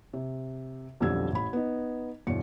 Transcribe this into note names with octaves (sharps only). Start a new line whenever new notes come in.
C3
B1 F2 D3 G3 E6 G#6
A1 B5
B3 D#4
G1 E2 B2 C#7